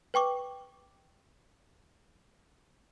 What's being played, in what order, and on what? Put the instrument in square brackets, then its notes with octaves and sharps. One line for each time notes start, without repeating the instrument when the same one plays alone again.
[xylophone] B4 G5 C#6 D6